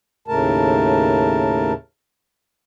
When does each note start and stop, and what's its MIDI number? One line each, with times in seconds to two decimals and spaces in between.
0.28 1.73 39
0.28 1.73 45
0.28 1.73 49
0.28 1.73 57
0.28 1.73 70
0.28 1.73 81